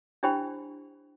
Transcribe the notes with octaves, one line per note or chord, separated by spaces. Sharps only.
D4 E4 G4 C5 G5 B5